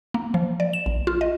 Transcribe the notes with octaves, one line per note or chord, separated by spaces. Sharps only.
A#3
F3
D5
E7
A#1
F4
D#5